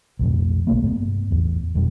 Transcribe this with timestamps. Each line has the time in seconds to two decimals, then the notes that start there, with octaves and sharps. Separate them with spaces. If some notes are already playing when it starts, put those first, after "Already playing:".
0.19 B1 F2 A2
0.67 A#1 C3 A3 A#3
0.83 G2 A#3 B3
1.31 A1 E2
1.75 F#1 F2 B2 G3